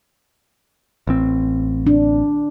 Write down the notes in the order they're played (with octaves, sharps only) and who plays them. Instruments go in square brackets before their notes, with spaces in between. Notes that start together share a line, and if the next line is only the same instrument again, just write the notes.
[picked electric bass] A1 C4
[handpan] D4